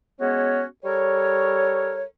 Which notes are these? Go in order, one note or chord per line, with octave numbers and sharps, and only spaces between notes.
G#3 B3 C#4 F#4 C#5
G3 A4 A#4 C#5